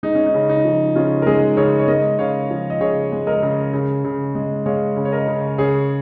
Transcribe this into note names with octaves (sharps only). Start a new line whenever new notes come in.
G#3 D#4
C#4
D#4
C#3
D#4
F3
C#3 C#4 F4
A#4
G#3 D#4 G#4
C#3 G#4 C#5
C#5
G#3 A#4 D#5
C#3 C#5 F5
F3
D#5
C#3 G#4 C#5
G#3
A#4 D#5
C#3
C#3
C#3
G#3
G#3 C#5 F5
C#3
C#5
A#4 D#5
C#3
C#3 G#4 C#5